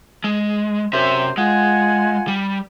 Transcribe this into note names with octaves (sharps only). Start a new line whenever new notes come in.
G#3
F#2 C3 C5 E5
G#3 F4 F#5 G#5
G3